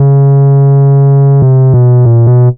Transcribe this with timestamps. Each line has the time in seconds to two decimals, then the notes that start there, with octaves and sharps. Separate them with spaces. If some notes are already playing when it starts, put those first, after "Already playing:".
Already playing: C#3
1.42 C3
1.74 B2
2.05 A#2
2.27 B2